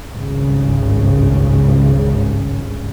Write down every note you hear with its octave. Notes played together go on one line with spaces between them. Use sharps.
G#1 C#2 G2 C#3